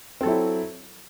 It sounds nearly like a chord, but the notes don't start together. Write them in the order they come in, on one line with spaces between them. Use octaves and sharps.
C4 A4 F#3 E4